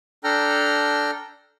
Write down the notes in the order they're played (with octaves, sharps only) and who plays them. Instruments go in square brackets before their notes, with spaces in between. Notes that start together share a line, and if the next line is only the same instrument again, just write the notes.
[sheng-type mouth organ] D4 A4 G5 A#5 F6